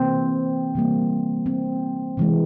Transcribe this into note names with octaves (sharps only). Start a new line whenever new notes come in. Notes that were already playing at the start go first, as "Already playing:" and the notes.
Already playing: C3 E3 A#3 C4
C3 E3 G3 A#3
C4
C3 E3 G#3